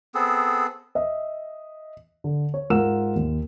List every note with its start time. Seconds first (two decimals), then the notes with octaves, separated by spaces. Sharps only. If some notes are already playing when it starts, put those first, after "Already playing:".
0.15 B3 C4 G#4 A4
0.95 D#5 E5
2.24 D3
2.54 C#5
2.70 G#2 F4 A#4 F#5 E6 E7
3.15 D#2